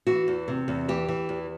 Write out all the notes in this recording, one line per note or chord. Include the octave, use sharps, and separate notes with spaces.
E3 F#4
E2
C3
E2
E3 G4
E3
E2